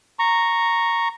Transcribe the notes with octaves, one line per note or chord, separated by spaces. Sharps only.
A#5 C#6